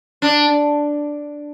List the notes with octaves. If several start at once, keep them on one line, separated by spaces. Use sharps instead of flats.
D4